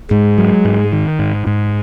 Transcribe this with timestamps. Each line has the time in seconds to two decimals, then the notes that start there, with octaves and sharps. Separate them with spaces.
0.11 G#2 G#3
0.38 F#3
0.65 G#2
0.92 D#3
1.19 G#2
1.47 G#2